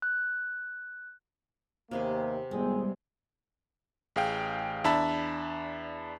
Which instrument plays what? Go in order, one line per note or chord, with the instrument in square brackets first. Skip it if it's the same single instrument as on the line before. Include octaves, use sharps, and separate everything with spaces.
[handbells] F#6
[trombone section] D#2 A#3 [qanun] C3 B3 G#4
[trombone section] G#1 A2 G#4 [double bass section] G3 G#3 B3 [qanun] C4
[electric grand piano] A1 G#4 F5 G5
E2 D4 E5 A5 B5